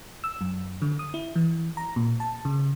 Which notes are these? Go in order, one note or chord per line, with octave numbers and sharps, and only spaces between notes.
E6
F#2
D3
D#6
E4
E3
A#5
A#2
A5
C#3